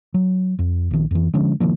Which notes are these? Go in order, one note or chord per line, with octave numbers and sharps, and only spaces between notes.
F#3
F2
A#1 D#3
F2 E3
D3 F3 G#3 C#4
C3 D#3 F3 A#3